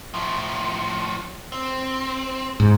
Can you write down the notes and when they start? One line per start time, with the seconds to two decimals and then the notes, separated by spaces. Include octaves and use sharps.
0.14 A2 F3
1.52 C4
2.60 G#2